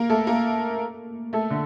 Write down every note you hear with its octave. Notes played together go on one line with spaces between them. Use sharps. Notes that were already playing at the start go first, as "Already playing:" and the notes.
Already playing: A#3 A#4
A3 A4
A#3 A#4
A3 A4
D3